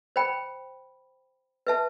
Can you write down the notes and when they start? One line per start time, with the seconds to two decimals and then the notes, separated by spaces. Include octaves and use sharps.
0.16 C5 G5 B5
1.67 B4 E5 A5